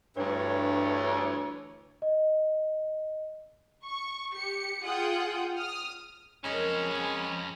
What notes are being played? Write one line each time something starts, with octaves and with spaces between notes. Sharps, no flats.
D2 G2 E3 C#5
D#5
C#6
G4 C#7
F4 G#4 F#5 G5 D#6
D#6 F6
F2 C#3 F#3 G#3 A#3 C#4
C#3 C4